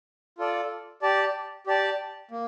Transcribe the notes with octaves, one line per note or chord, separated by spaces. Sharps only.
F4 A4 D5
G4 D5 A5
G4 D5 A5
A#3